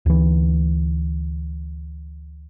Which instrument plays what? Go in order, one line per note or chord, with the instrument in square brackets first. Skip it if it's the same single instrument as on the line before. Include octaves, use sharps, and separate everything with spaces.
[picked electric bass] D2 E3